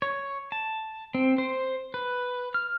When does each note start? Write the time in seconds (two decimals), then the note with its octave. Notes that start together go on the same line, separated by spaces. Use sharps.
0.02 C#5
0.52 A5
1.15 C4
1.38 C5
1.94 B4
2.54 F6